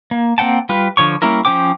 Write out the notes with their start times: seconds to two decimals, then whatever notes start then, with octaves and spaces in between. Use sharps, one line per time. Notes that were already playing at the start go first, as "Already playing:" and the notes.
0.11 A#3
0.38 A#3 C4 F#5 G5 A5
0.69 G3 F4 B4
0.97 D3 F3 C#5 C#6
1.22 G3 A#3 C#4 E4 A#4
1.45 F3 C#4 C5 G5 D6